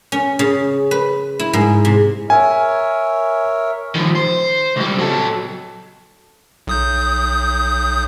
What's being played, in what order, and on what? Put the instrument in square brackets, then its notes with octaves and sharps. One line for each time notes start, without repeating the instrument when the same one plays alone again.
[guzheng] C#4
C#3
B4
E4
G#2
C3
[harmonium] A#4 C#5 E5 [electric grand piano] G#5
[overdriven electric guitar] D#3 F3
C5
C#2 G3
F#3 A4
[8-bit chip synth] B1 D#6 G6